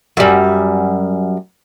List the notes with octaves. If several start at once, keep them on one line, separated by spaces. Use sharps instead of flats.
F#2 G3